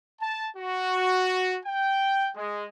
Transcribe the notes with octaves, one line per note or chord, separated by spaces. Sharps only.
A5
F#4
G5
G#3